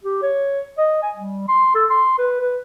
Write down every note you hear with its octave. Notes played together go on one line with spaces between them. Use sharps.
G4
C#5
D#5
G#5
G3
C6
A4
C6
B4
B4